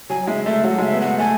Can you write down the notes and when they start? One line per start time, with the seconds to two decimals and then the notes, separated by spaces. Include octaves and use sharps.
0.10 F#3 G#5
0.27 G#3 E5
0.46 A3 E5
0.64 F#3 F#5
0.78 G#3 E5
0.92 B3
1.01 A3 F#5
1.19 A3 G#5